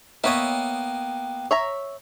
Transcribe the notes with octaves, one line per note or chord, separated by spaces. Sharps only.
A#3 B3 C#5 D#5 E5 G5
C#5 E5 A#5